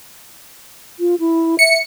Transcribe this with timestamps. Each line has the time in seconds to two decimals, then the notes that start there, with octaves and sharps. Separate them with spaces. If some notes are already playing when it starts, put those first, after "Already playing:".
1.00 F4
1.20 E4
1.59 E5 C#7